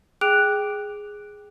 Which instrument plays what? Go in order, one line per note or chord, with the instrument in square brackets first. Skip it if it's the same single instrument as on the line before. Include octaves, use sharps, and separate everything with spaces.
[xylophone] G#4 G5 D6 F#6 D7 F7